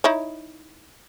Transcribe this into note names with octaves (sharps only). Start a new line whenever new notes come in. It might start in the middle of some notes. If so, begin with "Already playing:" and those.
D#4 E4 C#5